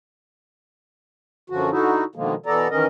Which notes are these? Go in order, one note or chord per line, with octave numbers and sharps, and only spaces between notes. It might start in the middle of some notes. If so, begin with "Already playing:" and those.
F#2 D3 F3 F#4
D3 D#4 E4 F#4
B2 D3 D#3 F3 G#3 A#3
B2 E3 B3 A4 D5 A#5
D#3 E3 C#4 A#4 D#5